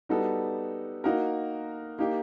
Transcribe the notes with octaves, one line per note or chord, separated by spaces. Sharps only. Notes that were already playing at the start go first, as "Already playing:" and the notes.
G3 B3 D#4 F#4 A4
A#3 D#4 F#4 A#4
A#3 D#4 G4